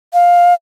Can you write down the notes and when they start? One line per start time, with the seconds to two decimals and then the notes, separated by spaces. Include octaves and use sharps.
0.13 F5